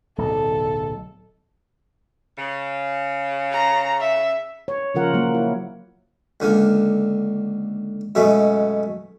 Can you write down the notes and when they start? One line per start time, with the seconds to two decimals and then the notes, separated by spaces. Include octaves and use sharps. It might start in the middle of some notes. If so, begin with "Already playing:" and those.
0.18 D1 B1 A4
2.38 C#3
3.53 A#5
4.01 E5
4.68 C#5
4.95 C#3 F3 F4 A#4 F#5
5.14 F#3 A#3
5.34 E4
6.40 C#2 D3 A#3
8.15 F#2 B2 G#3 A3